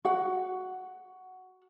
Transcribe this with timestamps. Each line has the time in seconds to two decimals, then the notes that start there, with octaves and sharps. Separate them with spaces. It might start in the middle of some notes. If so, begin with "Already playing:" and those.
0.05 F#4 F#5